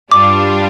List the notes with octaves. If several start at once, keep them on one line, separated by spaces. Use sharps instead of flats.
G2 G3 D4 F4 D6